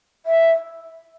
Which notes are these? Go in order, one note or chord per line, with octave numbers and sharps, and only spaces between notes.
E5